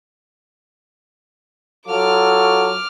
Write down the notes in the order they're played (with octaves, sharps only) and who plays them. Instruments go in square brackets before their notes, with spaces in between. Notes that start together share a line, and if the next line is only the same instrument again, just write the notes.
[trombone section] F#3 F4 A4 [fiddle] D6 F6